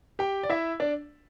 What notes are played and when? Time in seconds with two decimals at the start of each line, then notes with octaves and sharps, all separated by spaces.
0.19 G4 G5
0.43 D5
0.50 E4 E5
0.80 D4 D5